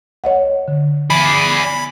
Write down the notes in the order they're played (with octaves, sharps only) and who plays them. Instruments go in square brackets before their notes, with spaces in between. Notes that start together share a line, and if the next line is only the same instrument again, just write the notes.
[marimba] C#5 D#5 F#5
D3
[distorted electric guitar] G#4 D5 [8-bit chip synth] B5